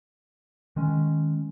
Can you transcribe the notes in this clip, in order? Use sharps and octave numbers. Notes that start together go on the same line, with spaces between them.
D#3 G#3 C#4